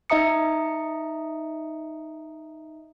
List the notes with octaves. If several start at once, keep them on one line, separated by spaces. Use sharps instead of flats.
D#4 D#5 E5 A#5 D#6 C#7